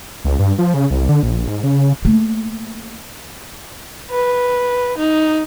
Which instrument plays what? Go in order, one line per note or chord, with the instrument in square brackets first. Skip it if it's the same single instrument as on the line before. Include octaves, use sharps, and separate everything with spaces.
[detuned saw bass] C#2
G2
F3
C#3
C2
D3
A#1
G#2
C#3
[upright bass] A3 A#3
[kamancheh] B4
D#4